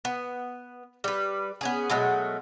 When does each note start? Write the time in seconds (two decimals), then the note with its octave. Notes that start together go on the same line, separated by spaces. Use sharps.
0.05 B3
1.04 G3 B4
1.61 B3 C#4 G#4
1.90 B2 F#3 G#3 A3